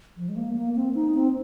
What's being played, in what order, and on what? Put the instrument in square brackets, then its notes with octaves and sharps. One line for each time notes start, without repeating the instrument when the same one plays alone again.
[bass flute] F3
G#3
A#3
A#3
C4
D#4
C4